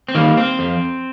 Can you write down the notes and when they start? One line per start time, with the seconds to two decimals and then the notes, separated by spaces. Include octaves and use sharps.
0.08 C4
0.15 D#3 G3 A#3
0.37 C4
0.59 F2